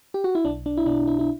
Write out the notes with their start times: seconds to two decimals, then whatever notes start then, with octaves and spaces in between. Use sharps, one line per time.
0.14 G4
0.24 F#4
0.35 E4
0.45 B1 D4
0.66 D4
0.77 E4
0.86 B2 D4
1.07 E4
1.19 E4